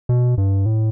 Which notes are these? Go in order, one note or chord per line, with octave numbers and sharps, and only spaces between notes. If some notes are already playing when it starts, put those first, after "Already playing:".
B2
G2
A2